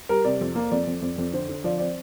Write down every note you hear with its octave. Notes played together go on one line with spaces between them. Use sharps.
G3 A#4
C3 D5
F2
A#3
F2 D5
F2
F2
F2
D3 C5
D3
F3 D5
C4 D5